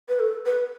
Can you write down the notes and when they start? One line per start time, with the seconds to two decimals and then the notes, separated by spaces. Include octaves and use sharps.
0.09 B4
0.19 A4
0.46 B4